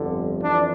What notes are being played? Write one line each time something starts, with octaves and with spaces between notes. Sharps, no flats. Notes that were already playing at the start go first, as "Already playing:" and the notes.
Already playing: G1 F2 D3
F2 E3 D4